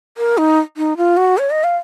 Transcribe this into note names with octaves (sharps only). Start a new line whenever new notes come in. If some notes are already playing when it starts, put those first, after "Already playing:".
A#4
D#4
D#4
F4
F#4
C#5
D#5
F5